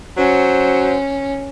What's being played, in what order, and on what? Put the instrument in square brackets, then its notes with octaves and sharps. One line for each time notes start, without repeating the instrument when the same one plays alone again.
[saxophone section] F#3 C5 [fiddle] C#4